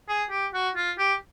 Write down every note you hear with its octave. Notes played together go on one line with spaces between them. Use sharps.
G#4
G4
F#4
F4
G4